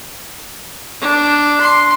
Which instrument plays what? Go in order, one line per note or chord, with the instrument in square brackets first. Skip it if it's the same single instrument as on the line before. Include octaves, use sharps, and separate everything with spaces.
[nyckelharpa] D4
C6